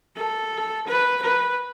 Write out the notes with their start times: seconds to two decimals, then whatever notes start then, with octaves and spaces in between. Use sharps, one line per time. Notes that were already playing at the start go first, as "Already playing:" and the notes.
0.16 A4
0.87 B4
1.22 B4